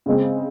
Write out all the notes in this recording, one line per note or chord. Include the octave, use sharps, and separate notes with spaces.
C#3 G#3 C4